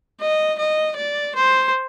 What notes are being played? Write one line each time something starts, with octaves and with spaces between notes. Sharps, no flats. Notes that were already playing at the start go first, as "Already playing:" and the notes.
D#5
D#5
D5
C5